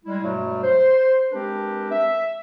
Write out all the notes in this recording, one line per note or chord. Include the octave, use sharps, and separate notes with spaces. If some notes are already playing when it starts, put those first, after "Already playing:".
G3 G#3 E4
G2 B2 F#3 G3 A3
C5
G#3 C4 D4 G4 A#4 B4
E5